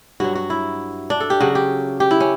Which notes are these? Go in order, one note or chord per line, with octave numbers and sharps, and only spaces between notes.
G2 F#3 F#4
F#4
E4
D4
A4
G4
C#3 F#3 F#4
G4
G4
E4
C#4